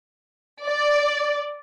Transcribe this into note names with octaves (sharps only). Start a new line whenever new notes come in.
D5